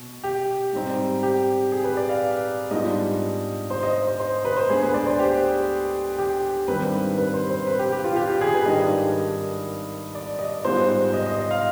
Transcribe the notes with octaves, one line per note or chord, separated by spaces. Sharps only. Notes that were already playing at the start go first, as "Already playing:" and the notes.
Already playing: B2
G4
G#2 G3 C4 D#4
G4
G#4
B4
D5
F5
G#2 G3 B3 D4 F4 D#5
C5
D#5
C5
C5
B4
C5
D2 D3 G#3 B3 G#4
B4
D5
C5
G4
G4
G#1 G2 D#3 G3 C4 B4
B4
C5
C5
B4
G4
G4
F4
G4
G4
G#4
B4
G#1 G2 D#3 G3 D4 D#5
D5
D#5
G#2 G3 B3 F4 C5
D#5
D#5
D#5
F5